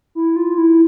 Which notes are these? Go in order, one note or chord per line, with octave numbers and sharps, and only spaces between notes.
E4
F4
E4